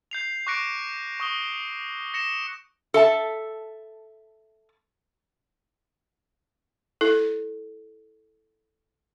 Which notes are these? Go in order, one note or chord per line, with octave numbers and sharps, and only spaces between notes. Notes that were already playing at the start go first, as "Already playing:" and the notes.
G6 C7 F7
C#6 D6 F#6 A#6 C#7 D7
C#6 D#6 G7
A#6 C#7 E7
A4 E5 A5
E4 A4